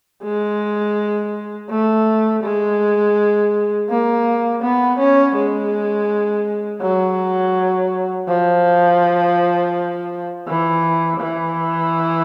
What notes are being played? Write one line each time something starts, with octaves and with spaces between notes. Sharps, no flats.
G#3
A3
G#3
A#3
B3
C#4
G#3
F#3
F3
E3
E3